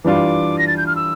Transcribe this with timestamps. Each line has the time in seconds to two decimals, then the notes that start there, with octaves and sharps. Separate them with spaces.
0.04 E3 G3 D4 F4 D6
0.58 A#6
0.68 A6
0.77 G6
0.87 F6
0.96 E6